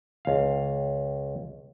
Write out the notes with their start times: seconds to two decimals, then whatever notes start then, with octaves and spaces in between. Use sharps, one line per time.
0.25 C#2 F5